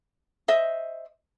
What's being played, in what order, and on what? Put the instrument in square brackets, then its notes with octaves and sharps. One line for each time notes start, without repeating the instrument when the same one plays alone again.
[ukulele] C5 D#5 E5